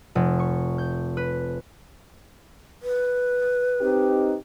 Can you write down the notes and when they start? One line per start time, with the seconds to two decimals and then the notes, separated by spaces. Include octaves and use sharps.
0.15 F1
0.39 C#6
0.78 G6
1.17 B4
2.82 B4
3.81 C4 D#4 G4